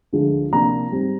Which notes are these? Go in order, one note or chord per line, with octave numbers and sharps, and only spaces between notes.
D2 D3 F3 G#3
C3 F3 A#3 D4 A#5
G#2 G3 C4